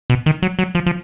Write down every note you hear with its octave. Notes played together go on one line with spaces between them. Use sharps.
B2
D#3
F#3
F#3
F3
F3